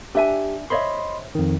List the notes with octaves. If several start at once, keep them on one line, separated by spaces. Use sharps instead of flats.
D4 G4 E5 G#5
C5 C#5 D#5 E5 B5 C6
F2 D#3